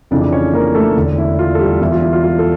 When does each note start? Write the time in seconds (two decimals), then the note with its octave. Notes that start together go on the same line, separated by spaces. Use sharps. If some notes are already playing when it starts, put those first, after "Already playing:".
0.11 F1 F2 C#3 E3 D4 D5
0.22 D5
0.32 C#4 C#5
0.53 A#3 A#4
0.74 A3 A4
0.97 E1 E2 D3
1.18 E4
1.39 F4
1.55 A4
1.59 G3 G4
1.81 E1 E2 E3 E4
1.92 F4
2.02 E4
2.13 F4
2.24 F4
2.39 A4